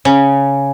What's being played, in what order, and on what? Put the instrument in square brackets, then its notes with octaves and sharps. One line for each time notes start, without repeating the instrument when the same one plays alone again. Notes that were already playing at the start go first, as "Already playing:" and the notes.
[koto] C#3